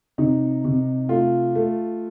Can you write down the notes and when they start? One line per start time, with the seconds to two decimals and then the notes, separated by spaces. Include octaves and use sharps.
0.18 C3 D#4
0.64 C3
1.09 A3 F4
1.55 A3